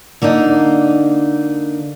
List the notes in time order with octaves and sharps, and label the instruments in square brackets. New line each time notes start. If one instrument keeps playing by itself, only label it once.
[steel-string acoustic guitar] D3 A#3 D4 D#4